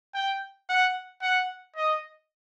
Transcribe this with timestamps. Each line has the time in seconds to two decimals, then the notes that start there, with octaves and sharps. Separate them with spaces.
0.15 G5
0.70 F#5
1.22 F#5
1.76 D#5